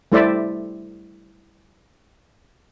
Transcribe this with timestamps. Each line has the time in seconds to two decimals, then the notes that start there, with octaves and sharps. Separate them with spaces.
0.12 G3 A3 E4 C5 D5 E5